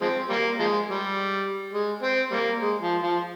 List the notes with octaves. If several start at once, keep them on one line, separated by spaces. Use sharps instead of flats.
F3 G#3 C4
G3 A#3
F3 G#3
G3
G#3
C4
G3 A#3
G#3
F3
F3